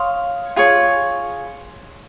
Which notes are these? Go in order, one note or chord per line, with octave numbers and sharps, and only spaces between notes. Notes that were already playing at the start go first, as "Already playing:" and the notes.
Already playing: C#5 F5 C6 D#6
F4 G#4 C#5